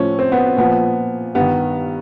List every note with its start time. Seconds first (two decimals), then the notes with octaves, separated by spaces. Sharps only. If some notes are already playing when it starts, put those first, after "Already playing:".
Already playing: A2 F3 C#4
0.19 C4
0.32 B3
0.57 A#2 F3 B3
1.35 G2 B3
1.40 D#3